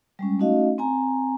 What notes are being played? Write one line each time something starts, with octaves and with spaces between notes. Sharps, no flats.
G3 G#3 C#4
A3 C#4 D#4 F#4 D#5 F5
C4 G#5 A#5